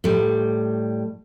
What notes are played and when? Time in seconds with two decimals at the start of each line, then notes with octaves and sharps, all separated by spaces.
0.04 A2 G3